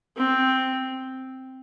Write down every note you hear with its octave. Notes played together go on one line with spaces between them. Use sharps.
C4